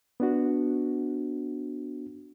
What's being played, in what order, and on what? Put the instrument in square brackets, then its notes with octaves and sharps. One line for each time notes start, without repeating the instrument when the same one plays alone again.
[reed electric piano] B3 D4 F#4